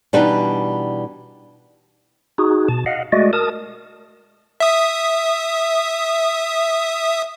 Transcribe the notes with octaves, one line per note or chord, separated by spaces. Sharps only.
B2 E3 G3 D4 D#4 B4
D#4 F#4 G#4
B2 A5
D#5 F5 F#5
G#3 A3 F#4 D5 D#5
A#4 A5 D#6
E5 D#6